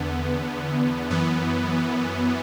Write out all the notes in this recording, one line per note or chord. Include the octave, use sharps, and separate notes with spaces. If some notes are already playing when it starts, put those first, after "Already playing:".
Already playing: E2 D3 B3
F#2 E3 B3